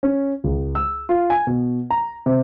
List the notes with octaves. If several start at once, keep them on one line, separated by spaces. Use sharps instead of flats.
C#4
C#2
E6
F4
G#5
B2
A#5
C3